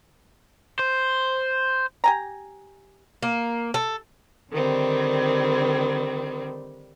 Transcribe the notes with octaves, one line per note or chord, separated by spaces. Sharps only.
C5
G4 G#5 A#5
A#3
A4
D3 D#3 G3 C4